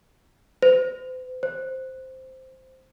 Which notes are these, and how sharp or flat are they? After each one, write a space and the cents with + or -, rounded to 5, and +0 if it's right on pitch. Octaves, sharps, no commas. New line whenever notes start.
C5 -40
C5 +0